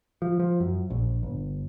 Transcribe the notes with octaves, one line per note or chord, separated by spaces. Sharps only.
F3
F3
F#2
A#1
G1